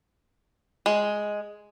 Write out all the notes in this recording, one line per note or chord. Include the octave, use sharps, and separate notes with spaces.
G#3